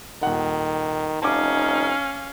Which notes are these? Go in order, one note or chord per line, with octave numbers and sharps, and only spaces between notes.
D#1 D#3 F#5
F1 C#4 D#4 F5 A5 D6